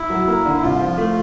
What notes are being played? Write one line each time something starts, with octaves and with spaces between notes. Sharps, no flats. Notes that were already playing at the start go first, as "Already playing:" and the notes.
Already playing: E4
F#3
A#3
D3
E4
C2 F4
F3
A3